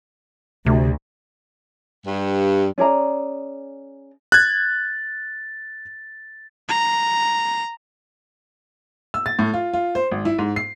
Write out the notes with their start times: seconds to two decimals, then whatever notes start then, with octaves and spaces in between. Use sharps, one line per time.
0.66 D2 C3
2.06 G2
2.78 C#4 G#4 D5 A#5
4.32 F#6 G#6 A6
6.69 A#5
9.14 E6
9.26 A6
9.39 A2
9.54 F4
9.73 F4
9.95 C5
10.11 G#1
10.25 E4
10.39 G#2
10.56 C7